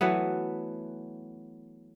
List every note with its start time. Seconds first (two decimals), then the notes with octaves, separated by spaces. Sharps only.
0.01 E3 F#3 A3 B3